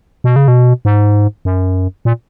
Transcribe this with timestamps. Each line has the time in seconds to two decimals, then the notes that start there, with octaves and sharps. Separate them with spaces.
0.24 B2
0.36 C#3
0.48 B2
0.85 G#2
1.45 F#2
2.05 A#2